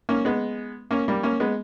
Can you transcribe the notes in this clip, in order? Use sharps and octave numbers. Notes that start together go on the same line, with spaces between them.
A#3 C#4
G#3 B3
A#3 C#4
G3 A#3
A#3 C#4
G#3 B3